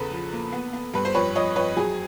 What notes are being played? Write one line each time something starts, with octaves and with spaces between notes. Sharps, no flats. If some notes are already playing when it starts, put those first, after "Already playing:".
Already playing: E2 C#3 A4 B4
F3
A#3
B3
B3
G2 B4
C5
F2 B4 C#5
F2 C#5 D#5
F2 B4 C#5
F#3 G#4